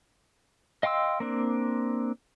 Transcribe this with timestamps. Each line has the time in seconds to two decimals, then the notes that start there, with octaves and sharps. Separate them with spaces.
0.83 D#5 F5 G5 C6 E6
1.20 A#3 C4 D4